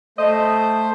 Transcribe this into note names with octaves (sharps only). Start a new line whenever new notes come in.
A3 C5 D#5